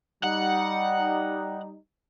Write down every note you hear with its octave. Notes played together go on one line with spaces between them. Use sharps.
G3 D#4 F#5